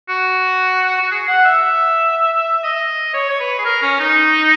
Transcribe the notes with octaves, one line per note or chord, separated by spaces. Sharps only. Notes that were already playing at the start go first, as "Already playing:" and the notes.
F#4
F#4
G#4
F#5
E5
D#5
C#5
C#5
B4
G#4
A#4
C#4
D#4